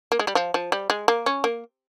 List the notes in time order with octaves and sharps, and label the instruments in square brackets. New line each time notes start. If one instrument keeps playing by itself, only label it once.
[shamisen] A#3
G#3
G3
F3
F3
G3
G#3
A#3
C#4
A#3